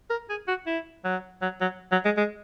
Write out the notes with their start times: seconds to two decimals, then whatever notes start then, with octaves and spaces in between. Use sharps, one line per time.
0.10 A#4
0.29 G#4
0.48 F#4
0.67 E4
1.05 F#3
1.42 F#3
1.61 F#3
1.92 F#3
2.05 G#3
2.17 G#3